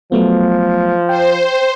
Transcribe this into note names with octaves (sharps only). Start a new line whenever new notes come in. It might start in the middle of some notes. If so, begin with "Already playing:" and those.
F3 F#3 A3 B3
C5 G5